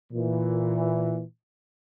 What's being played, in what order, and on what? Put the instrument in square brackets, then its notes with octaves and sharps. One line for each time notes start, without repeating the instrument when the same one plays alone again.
[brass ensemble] A#2 E3